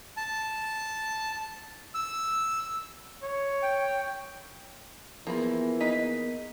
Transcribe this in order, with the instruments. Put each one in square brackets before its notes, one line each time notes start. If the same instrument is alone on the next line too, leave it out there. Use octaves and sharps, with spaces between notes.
[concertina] A5
E6
[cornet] C#5
[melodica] G5
[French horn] E3 [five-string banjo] F3 A#3 B5 [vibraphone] B3 G#4 A#4
[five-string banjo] A#3 D#4 B4 [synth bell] D#5 B6